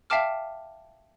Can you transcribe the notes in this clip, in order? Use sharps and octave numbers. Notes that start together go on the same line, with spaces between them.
E5 F5 G5 A5 D6 F6